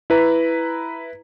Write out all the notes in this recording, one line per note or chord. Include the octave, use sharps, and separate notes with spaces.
E4 B4 A#5